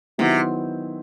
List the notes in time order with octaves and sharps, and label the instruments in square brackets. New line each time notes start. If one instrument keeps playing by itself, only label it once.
[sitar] C3 [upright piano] D#3 F#3 B3 E4